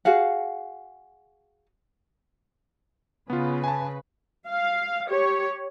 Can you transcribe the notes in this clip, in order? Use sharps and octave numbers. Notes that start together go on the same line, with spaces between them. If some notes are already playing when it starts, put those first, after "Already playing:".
F#4 G#4 F5 F#5
C#3 B3 F4 B4
G#5 A5
F5
G4 C#5